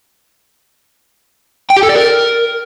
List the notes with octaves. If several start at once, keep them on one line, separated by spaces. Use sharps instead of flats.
G5
G4
A4
D5
A#4